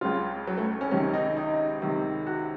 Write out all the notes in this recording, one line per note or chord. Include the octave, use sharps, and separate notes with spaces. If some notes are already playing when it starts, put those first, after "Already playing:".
C#2 C#3 F4
F#3
A3
C#4
C#2 C3 D#3 C#4
D#4
D#4
C#2 C3 D#3
F#4